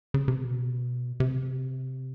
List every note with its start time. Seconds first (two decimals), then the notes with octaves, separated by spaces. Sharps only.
0.14 C#3
0.28 C3
0.41 B2
1.20 C3